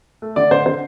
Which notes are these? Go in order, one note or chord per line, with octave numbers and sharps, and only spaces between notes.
A3
D3 D5
D3 C5
D3 C5